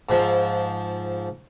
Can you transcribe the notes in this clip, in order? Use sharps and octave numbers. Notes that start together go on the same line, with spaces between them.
G#2 F3